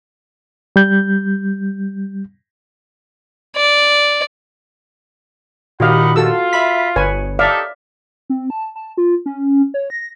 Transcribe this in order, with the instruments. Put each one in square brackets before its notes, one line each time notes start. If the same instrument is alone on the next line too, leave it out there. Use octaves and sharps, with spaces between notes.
[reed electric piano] G3 G6
[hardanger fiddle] D5
[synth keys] A#2 D#3 G4 [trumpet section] D#4 F#5 B5 [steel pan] F#4 F5
[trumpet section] F4 [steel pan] F#4 A4 E6
[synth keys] E5 B5 B6
[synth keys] G1 [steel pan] B4 C#5 G#5
[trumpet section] D#4 G4 A4 [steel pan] D5 E5 F5
[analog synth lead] C4
A5
A5
F4
C#4
C#5
A#6